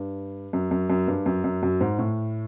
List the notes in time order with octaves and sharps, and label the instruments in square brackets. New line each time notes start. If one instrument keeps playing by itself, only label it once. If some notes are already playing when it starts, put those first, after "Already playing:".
Already playing: [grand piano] G2
F#2
F#2
F#2
G2
F#2
F#2
F#2
G#2
A2